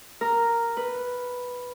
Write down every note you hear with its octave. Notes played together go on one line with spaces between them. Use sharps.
A#4
B4